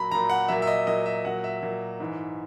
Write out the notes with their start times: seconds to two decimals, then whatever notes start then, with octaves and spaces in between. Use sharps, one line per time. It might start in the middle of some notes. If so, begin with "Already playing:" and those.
Already playing: A#2 F#3 A#5 B5
0.12 A#2 F#3 A#5
0.30 F#5
0.48 A#2 F#3 E5
0.62 E5
0.67 D#5
0.87 A#2 F#3 D#5
1.06 E5
1.24 A#2 F#3 F#5
1.44 E5
1.63 A#2 F#3
2.00 G#2 E3